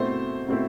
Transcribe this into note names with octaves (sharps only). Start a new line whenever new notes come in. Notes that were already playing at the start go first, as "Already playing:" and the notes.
Already playing: B2 A3 C4 E4 C5
B2 A3 C4 E4